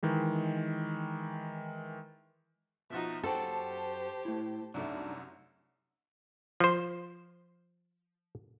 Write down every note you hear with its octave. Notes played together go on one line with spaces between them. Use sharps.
D#3 E3 G#3
B2 F3 D#4 F#4 E5
F#2 F#4 G4 A4 C5 G5 A5
A3 E4
C2 F#2 A3 D4 D#4
F3 C5